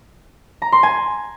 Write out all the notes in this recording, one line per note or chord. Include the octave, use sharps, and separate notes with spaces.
A#5
C6
G#5